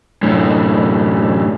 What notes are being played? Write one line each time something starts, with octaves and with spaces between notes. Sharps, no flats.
F#2 A2